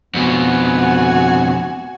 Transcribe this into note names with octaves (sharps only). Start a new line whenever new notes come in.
F2 B2 B3 F#4 G#5